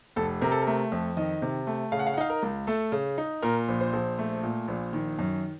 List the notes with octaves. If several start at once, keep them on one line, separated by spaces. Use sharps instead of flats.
F1 A4
C3 A#4
A4
A#4
A3
F2
D#3 D#5
C3
A3
C#3 F5
F#5
F5
F#5
D#4 F5
A#4
C#2
A3 A4
C#3
D#4
A#2 A#4
A#1
C5
A#1
A3
A#2
A#1
D#3
F#2